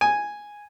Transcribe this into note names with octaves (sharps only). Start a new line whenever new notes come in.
G#5